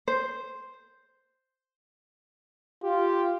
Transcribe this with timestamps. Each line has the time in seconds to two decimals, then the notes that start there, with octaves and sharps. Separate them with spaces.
0.08 C5
2.84 F4 G4